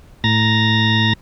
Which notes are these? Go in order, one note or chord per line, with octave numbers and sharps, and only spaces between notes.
A2 A#5 A6 A#6